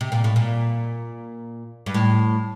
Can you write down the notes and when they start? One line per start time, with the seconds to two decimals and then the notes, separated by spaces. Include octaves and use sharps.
0.01 C3
0.12 A#2
0.24 A2
0.36 A#2
1.86 G2
1.94 A2